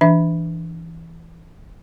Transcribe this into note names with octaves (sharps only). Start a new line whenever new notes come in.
E3 D4 E5